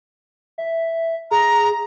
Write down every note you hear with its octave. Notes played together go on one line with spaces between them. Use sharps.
E5
G#4 A#5